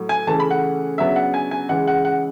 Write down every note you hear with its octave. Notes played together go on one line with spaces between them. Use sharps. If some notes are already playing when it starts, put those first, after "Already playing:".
Already playing: A2 F#3
G#5
C#3 E3 A3 C#4 A5
B5
F#5
C#3 F#3 B3 D4 E5
F#5
G#5
G#5
C#3 E3 G#3 F#5
F#5
F#5